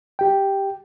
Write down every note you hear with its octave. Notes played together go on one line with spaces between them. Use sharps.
G4 G5